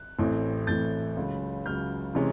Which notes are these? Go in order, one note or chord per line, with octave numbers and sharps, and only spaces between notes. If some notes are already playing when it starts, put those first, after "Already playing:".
Already playing: F#6
A1 A2 E3 A3 C4
A1 A2 E3 A3 C4 G6 A6
C#2 C#3 F#3
C#2 C#3 F#3 F6 G6
C3 E3 G#3 C#4